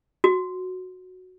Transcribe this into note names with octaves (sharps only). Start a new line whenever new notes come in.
F#4